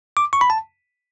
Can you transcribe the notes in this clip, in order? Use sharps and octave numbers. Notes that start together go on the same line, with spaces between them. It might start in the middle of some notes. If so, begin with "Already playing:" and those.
D6
C#6
B5
A5